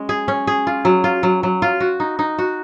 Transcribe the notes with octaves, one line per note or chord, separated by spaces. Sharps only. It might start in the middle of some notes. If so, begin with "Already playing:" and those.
Already playing: G#3 C#4
G#4
C#4
G#4
F4
F#3
F4
F#3
F#3
F4
F#4
D#4
D#4
F#4